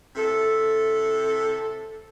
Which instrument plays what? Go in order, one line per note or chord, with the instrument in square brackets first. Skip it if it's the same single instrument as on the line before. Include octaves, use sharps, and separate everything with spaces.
[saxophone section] C3 E4 A4